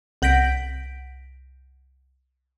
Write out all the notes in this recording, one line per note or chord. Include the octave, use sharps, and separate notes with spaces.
C2 F#5 G6 A#6 B6 D7